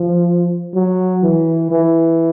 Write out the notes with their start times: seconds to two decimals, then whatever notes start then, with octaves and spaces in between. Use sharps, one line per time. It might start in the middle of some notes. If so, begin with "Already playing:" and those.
Already playing: F3
0.75 F#3
1.23 E3
1.71 E3